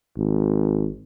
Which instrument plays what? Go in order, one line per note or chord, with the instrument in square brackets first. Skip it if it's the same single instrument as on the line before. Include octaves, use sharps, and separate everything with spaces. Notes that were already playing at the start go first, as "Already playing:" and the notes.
[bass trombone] G#1